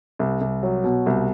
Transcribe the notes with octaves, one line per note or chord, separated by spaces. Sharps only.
C2
C2
F#3
B2
C2